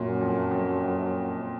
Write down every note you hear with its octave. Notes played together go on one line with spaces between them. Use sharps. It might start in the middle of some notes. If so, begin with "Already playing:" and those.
Already playing: F#2 A#2
F2
F2